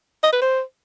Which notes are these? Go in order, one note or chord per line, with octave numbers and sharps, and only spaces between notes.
D#5
B4
C5